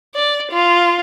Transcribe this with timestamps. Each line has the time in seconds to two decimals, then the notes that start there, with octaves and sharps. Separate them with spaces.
0.15 D5
0.52 F4